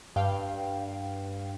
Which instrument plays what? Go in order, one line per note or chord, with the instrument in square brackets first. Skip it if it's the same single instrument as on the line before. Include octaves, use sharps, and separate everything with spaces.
[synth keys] G2 F5 G5